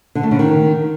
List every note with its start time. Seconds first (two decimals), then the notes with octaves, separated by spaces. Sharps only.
0.15 D3
0.23 A3
0.31 C#3
0.39 D#3